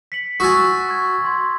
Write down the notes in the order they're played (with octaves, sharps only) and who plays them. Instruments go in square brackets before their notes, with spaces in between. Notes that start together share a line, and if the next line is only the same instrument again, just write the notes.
[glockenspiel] B6 C#7 F#7
[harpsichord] F#4 G#5 [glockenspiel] D#6 E6 A6
[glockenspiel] C#6 G#6
C6 G#6